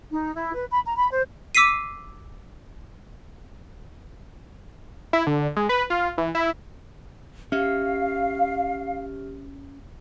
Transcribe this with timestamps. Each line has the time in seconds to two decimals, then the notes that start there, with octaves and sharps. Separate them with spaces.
0.12 D#4
0.34 E4
0.54 B4
0.71 B5
0.85 A#5
0.97 B5
1.11 C5
1.55 D6 E6 B6 C7 D#7
5.13 E4
5.27 D3
5.56 G#3
5.69 B4
5.90 F4
6.18 E3
6.35 E4
7.52 C#4 G4 E5 F5 F6